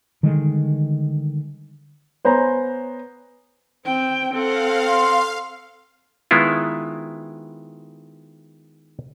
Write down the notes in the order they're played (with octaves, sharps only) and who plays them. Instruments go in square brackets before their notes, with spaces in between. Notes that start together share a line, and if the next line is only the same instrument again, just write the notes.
[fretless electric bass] D3 D#3 G3 G#3
[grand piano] B3 C5 C#5 G#5 A#5
[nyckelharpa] C4 [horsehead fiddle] G5
[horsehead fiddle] C4 [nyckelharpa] A4 F#5 [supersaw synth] F5
[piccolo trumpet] C6
[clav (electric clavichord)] D#3 G#3 B3 E4 F4